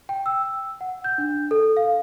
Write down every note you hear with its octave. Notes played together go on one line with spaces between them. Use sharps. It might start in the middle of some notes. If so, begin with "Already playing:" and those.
G5
E6
F#5
G6
D4
A4
F5